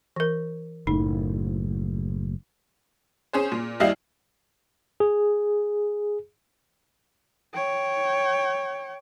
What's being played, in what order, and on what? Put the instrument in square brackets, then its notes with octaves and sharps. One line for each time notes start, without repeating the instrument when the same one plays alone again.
[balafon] E3 A#4
[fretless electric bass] F#1 A2 [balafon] D#4
[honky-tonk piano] C#4 G#4 C5
A#2
D#2 G3 E4 D#5 F5 F6
[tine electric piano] G#4
[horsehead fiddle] C#5 G5